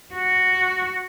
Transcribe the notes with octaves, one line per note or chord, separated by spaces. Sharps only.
F#4